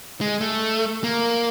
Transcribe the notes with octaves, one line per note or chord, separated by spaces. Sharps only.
G#3
A3
A#3